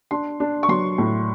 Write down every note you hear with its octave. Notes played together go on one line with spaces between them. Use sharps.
D4 C6
D4
C#6
F#3 C6
A2